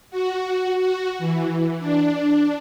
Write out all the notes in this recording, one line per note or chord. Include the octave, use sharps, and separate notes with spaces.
F#4
F#4
E3
D4